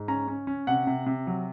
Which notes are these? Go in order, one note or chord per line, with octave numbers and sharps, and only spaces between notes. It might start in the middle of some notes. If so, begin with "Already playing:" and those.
Already playing: G#2
C#4 A#5
C#4
C#4
C3 F#5
C3
C3
F#3